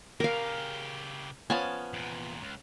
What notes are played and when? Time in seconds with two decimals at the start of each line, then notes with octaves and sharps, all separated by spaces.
0.20 C#3 G4 A#4 F5
1.50 F3 B3 C#4 G#5 A5
1.93 E2 A#2
2.42 C#2